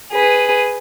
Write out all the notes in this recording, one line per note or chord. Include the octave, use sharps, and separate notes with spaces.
G#4 B4